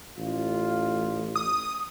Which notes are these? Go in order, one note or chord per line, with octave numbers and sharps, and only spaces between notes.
A1 F4
D#6